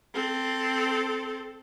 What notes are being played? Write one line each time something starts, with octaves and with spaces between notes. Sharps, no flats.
C4 A4